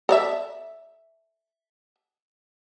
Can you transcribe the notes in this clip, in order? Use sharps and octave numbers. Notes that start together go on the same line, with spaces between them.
A4 D5 E5